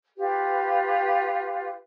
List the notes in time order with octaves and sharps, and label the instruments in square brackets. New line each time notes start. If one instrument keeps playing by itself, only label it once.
[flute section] F4 G4 B4